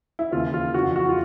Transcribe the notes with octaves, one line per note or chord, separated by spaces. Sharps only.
E4
D#2 C#3 E3 F4
F4
F2 C#3 E3 F#4
F#4
F4